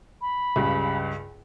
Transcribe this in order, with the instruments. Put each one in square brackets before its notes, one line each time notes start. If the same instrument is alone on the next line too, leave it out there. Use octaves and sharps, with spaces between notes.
[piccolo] B5
[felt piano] C#2 G2 C#3